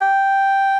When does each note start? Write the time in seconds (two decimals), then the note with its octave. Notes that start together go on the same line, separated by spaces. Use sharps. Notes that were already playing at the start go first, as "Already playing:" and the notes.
0.02 G5